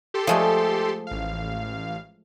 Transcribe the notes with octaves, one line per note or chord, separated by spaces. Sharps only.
G4 A4 C6
F3 G#3 A3
A1 F5